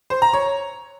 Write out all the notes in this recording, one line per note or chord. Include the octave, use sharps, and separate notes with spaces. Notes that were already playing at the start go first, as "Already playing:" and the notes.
C5
A#5
C#5